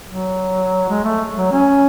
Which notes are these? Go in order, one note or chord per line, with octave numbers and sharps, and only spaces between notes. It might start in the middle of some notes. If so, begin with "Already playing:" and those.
F#3
G#3
A3
F#3
C#4